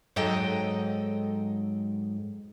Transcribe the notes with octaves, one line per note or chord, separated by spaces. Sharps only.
G#2 F#3 A4 D#5 G5